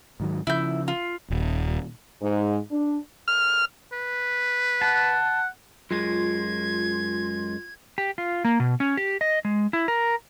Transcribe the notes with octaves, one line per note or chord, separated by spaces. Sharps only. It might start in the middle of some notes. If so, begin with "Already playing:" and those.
G#2 D#3 F#3
C#3 F3 E4 G6
F4
D#1
G#2
D4
F6
B4
F#5 A5
F#2 G#3 F4 G#6
G4
F4
A#3
B2
C#4
G4
D#5
G#3
E4
A#4